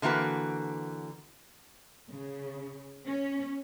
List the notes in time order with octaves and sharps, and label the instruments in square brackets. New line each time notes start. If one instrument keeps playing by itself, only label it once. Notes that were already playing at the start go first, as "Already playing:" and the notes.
[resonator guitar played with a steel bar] D3 E3 A#3 F#4 B4
[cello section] C#3
C#4